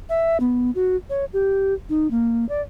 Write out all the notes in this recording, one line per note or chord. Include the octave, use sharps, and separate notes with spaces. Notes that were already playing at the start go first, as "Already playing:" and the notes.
E5
B3
F#4
C#5
G4
D#4
A#3
D5